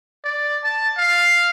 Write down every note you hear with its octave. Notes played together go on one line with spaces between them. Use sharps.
D5
A5
F5